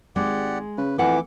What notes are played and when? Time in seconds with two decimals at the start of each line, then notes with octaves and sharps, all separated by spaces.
0.16 G#1 G#3 G4 D5 F#5
0.78 C#3 B4
0.98 F2 E3 A3 A4 F#5 D6